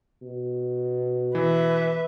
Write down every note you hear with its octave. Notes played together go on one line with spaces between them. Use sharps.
B2
E3 B4 E5